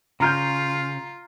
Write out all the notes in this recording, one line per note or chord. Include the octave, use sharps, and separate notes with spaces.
C#3 F4 A#5 F6 G6